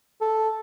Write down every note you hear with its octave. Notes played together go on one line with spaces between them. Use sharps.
A4